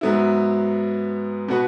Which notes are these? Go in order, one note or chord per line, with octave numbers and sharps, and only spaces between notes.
G#2 F#3 B3 E4
B2 B3 F#4 B4